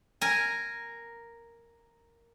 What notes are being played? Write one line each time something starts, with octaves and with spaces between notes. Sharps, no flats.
A#4 G#5